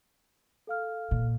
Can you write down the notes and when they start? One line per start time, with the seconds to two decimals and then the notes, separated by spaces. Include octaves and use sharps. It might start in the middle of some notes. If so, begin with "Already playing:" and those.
0.67 A4 F5 F6
1.11 A#2